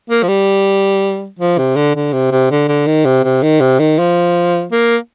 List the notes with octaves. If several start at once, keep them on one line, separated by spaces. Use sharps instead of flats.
A#3
F3
G3
F3
C3
D3
D3
C3
C3
D3
D3
D#3
C3
C3
D#3
C3
D#3
F3
A#3